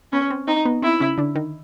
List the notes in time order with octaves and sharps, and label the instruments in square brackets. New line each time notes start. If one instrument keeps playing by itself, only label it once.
[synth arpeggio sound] B3 [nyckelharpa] C#4
[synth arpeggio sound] C4
[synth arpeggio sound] C4 [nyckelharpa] D#4
[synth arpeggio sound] B3
[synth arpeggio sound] C4 [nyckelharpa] E4
[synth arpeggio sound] C#3 C#4
D3 D4
D#3 D#4